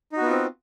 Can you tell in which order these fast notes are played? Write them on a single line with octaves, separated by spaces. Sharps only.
D#4 F#4 B3 F4 C4